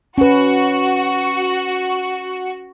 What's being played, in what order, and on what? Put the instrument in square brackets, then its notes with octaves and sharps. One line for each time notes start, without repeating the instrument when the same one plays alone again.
[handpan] C#4 B4 [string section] F#4